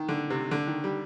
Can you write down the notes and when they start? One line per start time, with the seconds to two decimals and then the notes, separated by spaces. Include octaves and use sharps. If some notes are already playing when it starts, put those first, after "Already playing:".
Already playing: D#3
0.09 D3
0.30 C3
0.51 D3
0.67 D#3
0.84 G3